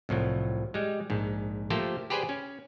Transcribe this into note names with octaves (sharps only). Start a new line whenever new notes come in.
C2 A2 F3 F#3
G3 G#3
A#1 G#2
F3 A3 A#3 G4 C5 A5
G4 G#4 B4 C5 D5 G#5
C#4